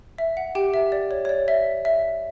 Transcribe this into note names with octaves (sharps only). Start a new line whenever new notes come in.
E5
F#5
G4 G5
E5
D5
C#5
C#5
D5
E5
E5